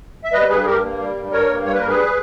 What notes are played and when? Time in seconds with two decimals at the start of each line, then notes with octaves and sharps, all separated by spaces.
0.24 E5
0.33 G3 B4 D#5
0.49 G2 G#4 B4
0.61 G#4
0.65 G2 G4 A#4
0.82 A#3
0.99 G3
1.15 G2
1.32 G2 A#4 C#5
1.49 A#3
1.65 G3 C#5
1.73 B4
1.80 G2 A#4
1.87 G#4 B4